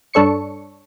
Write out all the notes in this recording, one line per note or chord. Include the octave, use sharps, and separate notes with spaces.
G2 D4 A4 C#5 C#6 C#7